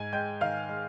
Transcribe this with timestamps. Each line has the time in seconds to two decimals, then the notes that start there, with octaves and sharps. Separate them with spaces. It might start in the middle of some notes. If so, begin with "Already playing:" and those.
Already playing: G#2 G#5 G#6
0.13 G#3 G5 G6
0.41 D#3 F5 F6
0.69 G#3